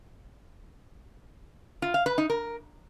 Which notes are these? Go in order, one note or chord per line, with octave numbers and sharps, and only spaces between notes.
F4
F5
B4
D#4
A#4